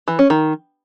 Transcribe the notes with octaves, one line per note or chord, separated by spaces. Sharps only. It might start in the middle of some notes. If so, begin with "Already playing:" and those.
E3
C#4
D#3